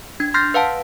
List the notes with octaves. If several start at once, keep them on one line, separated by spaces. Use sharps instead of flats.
D4 G#6
C6 F6 G6 A6 A#6 C7
B4 F5 F#5 A5